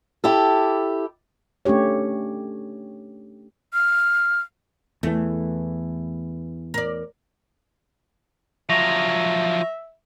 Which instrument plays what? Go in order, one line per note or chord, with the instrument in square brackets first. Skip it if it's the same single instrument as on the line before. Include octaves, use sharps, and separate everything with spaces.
[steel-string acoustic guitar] E4 G4 A4
[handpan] A3 C#4 D4 G4 C#5
[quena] F6
[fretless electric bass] E2 E3 [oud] A3
[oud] A#4 D5
[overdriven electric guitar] F3 F#3 [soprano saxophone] E5 [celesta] C#6 A#6 F7